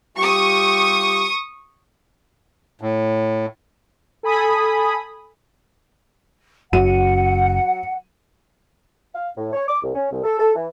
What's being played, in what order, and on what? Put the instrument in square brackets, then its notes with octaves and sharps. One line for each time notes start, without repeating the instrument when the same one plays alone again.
[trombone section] G3 F4 G4 [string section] C#6 D#6
[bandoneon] A2
[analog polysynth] A4 G#5 B5 D#6
[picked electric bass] F#1 F#2 [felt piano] F#3 D#7 [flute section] F#5
[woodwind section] F5
A2
C#5
D6
C2
C#4
C2
A4
A4
E3